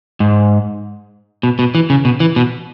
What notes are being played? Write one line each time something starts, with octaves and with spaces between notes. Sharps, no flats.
G#2
B2
B2
E3
C#3
B2
E3
B2